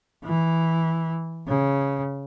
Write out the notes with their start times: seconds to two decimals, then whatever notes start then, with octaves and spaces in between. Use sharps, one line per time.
0.24 E3
1.47 C#3